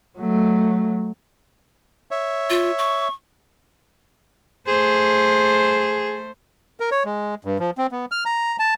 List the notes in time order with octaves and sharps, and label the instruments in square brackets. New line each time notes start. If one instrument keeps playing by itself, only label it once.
[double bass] F#3 A3
[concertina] C#5 E5
[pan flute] F4
C#6
[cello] A3 C5 [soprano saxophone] G#4
[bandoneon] A#4
C#5
G#3
G2
F3
C4
B3
F6
A#5
A5